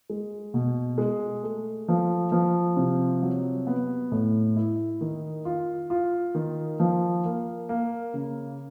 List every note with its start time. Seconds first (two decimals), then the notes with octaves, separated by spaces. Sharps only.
0.10 G#3
0.54 B2
0.98 G#3
1.43 A3
1.88 F3
2.32 F3
2.77 C3
3.23 F#3
3.67 B3
4.12 A2
4.56 E4
5.01 D#3
5.45 F4
5.90 F4
6.35 D#3
6.80 F3
7.25 A#3
7.69 A#3
8.14 C#3